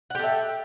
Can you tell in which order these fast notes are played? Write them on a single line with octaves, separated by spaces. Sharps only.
F#5 G4 A4 E5